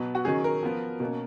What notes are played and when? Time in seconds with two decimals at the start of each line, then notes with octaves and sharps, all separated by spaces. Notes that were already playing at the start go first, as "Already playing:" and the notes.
Already playing: B2 F#3 B3
0.15 F#4
0.25 D#3 F#3 C#4 G#4
0.44 A#4
0.63 F3 B3
1.00 B2 A#3 C#4